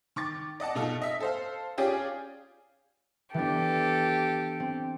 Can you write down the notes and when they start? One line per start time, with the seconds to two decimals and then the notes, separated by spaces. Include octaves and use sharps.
0.16 D#3 C#6 D6 A6
0.60 D5 D#5 F#5 A5
0.75 B2 A3 D#4 F4 A4
1.02 D#5 E5
1.20 A4 C5 F5
1.78 C#4 F4 G4 G#4 D5
3.34 E3 B3 D4 G4 A4
4.60 C4